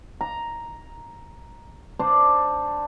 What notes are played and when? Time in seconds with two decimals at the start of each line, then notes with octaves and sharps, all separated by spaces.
0.21 A#5
1.99 D4 C5 D5